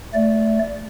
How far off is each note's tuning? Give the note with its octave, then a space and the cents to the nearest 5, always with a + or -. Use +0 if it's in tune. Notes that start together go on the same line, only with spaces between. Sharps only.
A3 +0 D5 -20